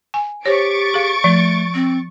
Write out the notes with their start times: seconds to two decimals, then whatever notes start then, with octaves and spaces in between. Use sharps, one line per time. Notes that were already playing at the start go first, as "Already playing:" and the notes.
0.14 G#5
0.46 G4 C5 C#5 C#6 A6 D7
0.94 G#4 F5
1.24 F3 A3
1.74 C4